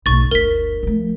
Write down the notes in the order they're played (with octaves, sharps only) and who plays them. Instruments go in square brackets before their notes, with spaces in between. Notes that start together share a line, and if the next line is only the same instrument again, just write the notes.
[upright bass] B1 A3 [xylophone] C#6 A6
[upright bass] G1 D2 [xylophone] A#4 B6
[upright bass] F3 A3